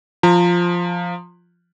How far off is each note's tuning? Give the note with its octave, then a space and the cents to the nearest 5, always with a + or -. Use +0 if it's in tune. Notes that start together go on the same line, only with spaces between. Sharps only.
F3 +0 A#5 -30